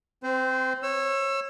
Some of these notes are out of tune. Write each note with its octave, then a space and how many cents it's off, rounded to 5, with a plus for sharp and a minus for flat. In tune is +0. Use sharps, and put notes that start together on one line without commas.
C4 +0 C5 -25
C#5 -20 E6 +20